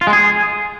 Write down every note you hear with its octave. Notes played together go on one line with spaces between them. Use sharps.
F4
G#3
G#4